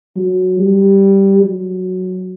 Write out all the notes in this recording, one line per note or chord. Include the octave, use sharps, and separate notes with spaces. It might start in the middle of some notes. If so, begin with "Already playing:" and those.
F#3
G3
F#3